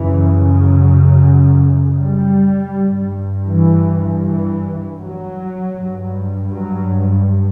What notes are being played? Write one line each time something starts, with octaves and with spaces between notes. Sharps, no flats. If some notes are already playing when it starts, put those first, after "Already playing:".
Already playing: F#2 C#3 E3
F#3
G3
G2
E3
E3
F#3
G2
F#3